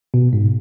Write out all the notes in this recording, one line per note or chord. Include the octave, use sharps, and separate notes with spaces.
B2
G#2